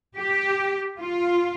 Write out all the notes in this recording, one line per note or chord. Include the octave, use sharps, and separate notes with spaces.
G4
F4